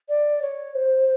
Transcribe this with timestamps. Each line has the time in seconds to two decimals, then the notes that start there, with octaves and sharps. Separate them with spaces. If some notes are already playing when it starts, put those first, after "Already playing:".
0.09 D5
0.42 C#5
0.75 C5